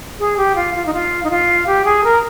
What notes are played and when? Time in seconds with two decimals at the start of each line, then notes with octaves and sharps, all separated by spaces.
0.19 G#4
0.37 G4
0.55 F4
0.74 F4
0.85 D#4
0.93 F4
1.23 D#4
1.30 F4
1.66 G4
1.85 G#4
2.03 A#4